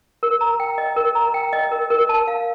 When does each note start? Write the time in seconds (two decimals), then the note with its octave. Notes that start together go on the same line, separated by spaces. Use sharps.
0.23 A#4
0.41 A#5
0.60 G5
0.78 D#5
0.96 A#4
1.15 A#5
1.34 G5
1.53 D#5
1.71 A#4
1.90 A#4
2.09 A5
2.27 F5